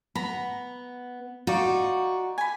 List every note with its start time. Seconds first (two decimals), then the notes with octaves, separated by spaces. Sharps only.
0.15 B3 A#5 B5
1.47 D#4 F4 F#4 D5
2.38 G#5 B5